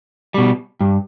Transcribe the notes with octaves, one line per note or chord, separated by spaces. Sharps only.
B2 G3
G2